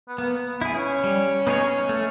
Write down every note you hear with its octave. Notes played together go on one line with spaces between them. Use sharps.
B3
A#3 B3
B3
E4 G#4
C#4
G3
B3 D#4 G#4 C#5
A3